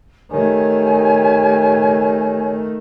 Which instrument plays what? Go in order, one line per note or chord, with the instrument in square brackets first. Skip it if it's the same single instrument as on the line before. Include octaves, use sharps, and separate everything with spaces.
[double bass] D#3 A3 [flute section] G4 C#5 G#5